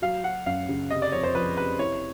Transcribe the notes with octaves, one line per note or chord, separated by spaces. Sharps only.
F#3 F5
F#3 F#5
F#2 F5
C#3
C3 D#5
D5
F2 C#5
C5
F3 B4
C3 B4
E4 C#5